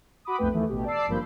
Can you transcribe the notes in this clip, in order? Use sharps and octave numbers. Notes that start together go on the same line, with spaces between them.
F#4 B5 D6 D#6
B1 F2 A3 B4 G5
D#2 E3 A3
A1 B2 G4
D5 A5 D6 E6 C7
G#1 G2 F3 A#3 B5 G6